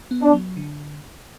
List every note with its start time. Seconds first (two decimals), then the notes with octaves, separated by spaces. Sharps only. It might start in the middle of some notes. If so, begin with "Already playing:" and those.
0.11 B3
0.22 D4
0.33 F#3
0.57 D3